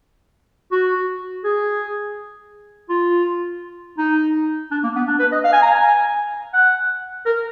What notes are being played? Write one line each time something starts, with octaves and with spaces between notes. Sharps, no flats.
F#4
G#4
F4
D#4
D4
A#3
B3
D4
B4
D#5
F5
G#5
A#5
G#5
F#5
A#4